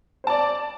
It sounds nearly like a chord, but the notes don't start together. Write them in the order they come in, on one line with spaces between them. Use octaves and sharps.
C5 A5 D5